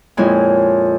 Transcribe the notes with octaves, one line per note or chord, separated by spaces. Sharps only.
F2 A#2 G#3 C#4 E4 G#5